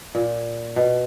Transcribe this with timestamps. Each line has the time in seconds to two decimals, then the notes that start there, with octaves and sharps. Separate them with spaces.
0.15 A#2
0.76 B2